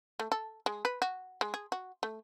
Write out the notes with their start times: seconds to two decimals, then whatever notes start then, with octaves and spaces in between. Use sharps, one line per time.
0.20 A3
0.32 A4
0.66 G#3
0.85 B4
1.02 F#4
1.41 G#3
1.54 G#4
1.72 F#4
2.03 A3